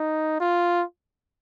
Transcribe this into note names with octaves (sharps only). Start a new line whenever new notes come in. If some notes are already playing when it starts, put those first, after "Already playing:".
Already playing: D#4
F4